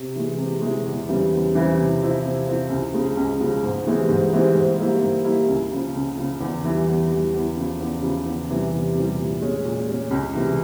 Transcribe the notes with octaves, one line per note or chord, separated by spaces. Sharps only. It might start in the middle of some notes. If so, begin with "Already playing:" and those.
Already playing: C3
E3 G#3
C3
E3 G#3
E2
C#3 E3 G3 C4
E2
C#3 E3 G3 C4
C3
F3 C4 E4
C3
F3 C4 E4
C#2
C#3 F3 G#3
C#2
C#3 F3 G#3
G#2
E3 G#3 C4 G4
G#2
E3 G#3 C4 G4
G#2
G3 A#3 E4 G4
G#2
G3 A#3 E4 G4
C#2
C#3 F3
C#2
C#3 F3
E2
E3 G3
E2
E3 G3
E2
C#3 F3
E2
C#3 F3
E2
C3 E3 G3
E2
C3 E3 G3
A#2
G#3 C#4
A#2
G#3 C#4
C#2
C3 E3 G#3